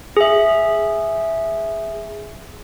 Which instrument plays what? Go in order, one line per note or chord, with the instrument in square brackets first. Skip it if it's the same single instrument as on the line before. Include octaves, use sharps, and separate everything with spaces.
[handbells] G#4 E5